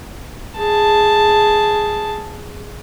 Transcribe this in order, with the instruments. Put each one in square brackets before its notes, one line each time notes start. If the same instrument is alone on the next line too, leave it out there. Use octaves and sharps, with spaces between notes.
[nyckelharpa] G#4 A5